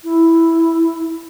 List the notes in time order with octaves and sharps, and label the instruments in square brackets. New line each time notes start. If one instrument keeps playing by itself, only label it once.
[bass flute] E4